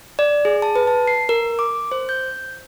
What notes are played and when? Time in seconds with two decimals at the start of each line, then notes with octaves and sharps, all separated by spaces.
0.19 D5
0.45 G#4
0.62 A5
0.76 B4
0.87 A5
1.08 C7
1.29 A#4
1.59 D6
1.92 C5
2.09 G6